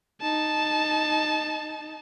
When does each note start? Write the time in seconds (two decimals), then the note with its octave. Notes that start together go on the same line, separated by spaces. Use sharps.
0.21 D#4 A5